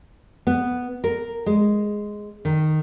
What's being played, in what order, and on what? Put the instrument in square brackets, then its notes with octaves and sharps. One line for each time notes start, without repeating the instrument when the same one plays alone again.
[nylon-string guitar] B3
A#4
G#3
D#3